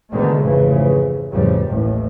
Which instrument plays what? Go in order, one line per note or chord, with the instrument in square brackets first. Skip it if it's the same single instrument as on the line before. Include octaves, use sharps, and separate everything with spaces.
[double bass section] G#2 B2 D3 D#3 G#3 A3
F1 G#2 C#3 E3
A1 F2 C#3 G3
A1 D#2 A2